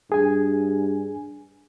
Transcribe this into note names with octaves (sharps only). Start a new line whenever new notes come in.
G2 G#4 G#5